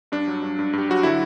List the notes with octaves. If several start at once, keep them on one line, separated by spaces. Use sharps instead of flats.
G2 D4
F#3
G2
G2
G2 G4
F#3 F#4
D3 E4